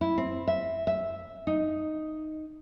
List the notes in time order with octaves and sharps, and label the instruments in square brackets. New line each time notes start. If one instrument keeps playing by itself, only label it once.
[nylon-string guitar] E4
C4
E5
E5
D#4